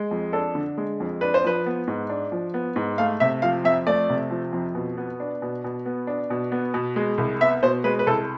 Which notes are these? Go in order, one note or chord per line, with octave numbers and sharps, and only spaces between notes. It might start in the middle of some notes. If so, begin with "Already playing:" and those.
Already playing: G#3
F2
D4 A4
D3
G#3
F2
D4 B4
C5
F3 B4
B3
G#2
D4
F3
B3
G#2
A3 F5
C3 E5
F3 F5
F2 E5
A3 D5
C3
F3
F2
B2
B3
D4
B2
B2
B3
D4
B2
B3
B2
G#3
C2
B3 E5
B2 C5
G#3 B4
B4
C2 A4